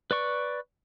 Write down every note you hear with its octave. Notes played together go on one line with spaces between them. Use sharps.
B4 D5 C#6